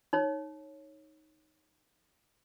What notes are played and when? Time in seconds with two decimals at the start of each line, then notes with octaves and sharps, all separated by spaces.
0.13 D#4 C#5